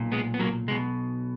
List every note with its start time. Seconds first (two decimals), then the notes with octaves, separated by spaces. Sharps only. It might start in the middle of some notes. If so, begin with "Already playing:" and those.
Already playing: B1 A#2
0.12 G#3 B3
0.34 B3
0.39 F#3 A#3
0.68 B1 B2 G#3